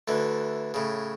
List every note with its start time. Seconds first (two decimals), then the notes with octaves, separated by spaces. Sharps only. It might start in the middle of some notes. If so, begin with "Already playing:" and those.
0.08 D2 D3 E3
0.74 A2 C#3